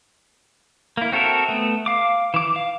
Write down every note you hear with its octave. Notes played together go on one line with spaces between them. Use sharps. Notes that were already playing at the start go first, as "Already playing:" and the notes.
A#3 E4
C4 F#4 A4 A#4 E5
A3 B3
F5 D6
E3 D6
F5